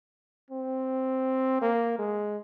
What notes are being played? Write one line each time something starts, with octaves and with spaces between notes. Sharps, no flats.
C4
A#3
G#3